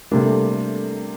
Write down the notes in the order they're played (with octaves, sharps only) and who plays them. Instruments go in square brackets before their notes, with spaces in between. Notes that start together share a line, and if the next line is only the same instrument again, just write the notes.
[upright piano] C3 G3 A#3 D4 [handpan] A3